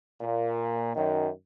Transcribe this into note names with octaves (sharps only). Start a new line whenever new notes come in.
A#2
F#2 D#3